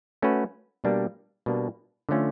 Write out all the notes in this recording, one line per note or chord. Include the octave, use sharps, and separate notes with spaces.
A3 C#4 F#4 B4
B2 G3 A#3 D4
B2 G3 A#3 D4
D3 F3 A3 C#4 F4